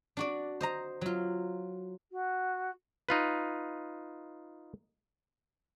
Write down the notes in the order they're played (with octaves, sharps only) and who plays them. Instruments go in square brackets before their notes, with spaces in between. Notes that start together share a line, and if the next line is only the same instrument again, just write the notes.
[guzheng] D4 F#4 D5
C5 D#5 A#5
F#3 F4
[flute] F#4
[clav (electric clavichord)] D#4 F4 B4